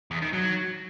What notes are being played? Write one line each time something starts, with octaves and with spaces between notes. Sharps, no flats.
E2
D#3
F#3